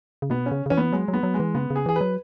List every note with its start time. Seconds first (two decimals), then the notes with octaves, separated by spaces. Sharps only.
0.22 C#3
0.30 B2 B3
0.46 C#4
0.51 C#3
0.66 C#3
0.70 E3 C#4
0.77 B3
0.93 F#3 G#3
1.08 F#3
1.13 B3
1.23 F#3
1.34 G#3
1.40 E3
1.55 C#3 B3
1.70 C#3
1.76 G#4
1.86 E3 G#4
1.96 F#3 B4